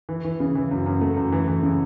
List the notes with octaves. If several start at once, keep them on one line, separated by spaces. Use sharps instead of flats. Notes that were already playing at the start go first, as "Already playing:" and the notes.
E3
E3
C#3
E3
F#2
F#2
A3
F#2
E3
E3
C#3